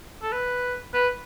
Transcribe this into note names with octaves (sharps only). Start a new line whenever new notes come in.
A4
B4
B4